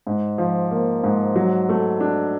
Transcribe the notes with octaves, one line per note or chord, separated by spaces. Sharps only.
G#2
F3
A#3
G#2
F#3
A3
D4